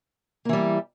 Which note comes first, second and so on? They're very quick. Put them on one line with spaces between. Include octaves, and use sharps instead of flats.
A#3 E3 G3